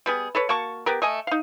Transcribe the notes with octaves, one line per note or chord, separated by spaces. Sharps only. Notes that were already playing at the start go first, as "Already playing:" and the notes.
G3 B3 G#4
A4 B4 C#5
A#3 F#4 A5 C#6
B3 G4 A#4
A3 D#5 G#5
D#4 F5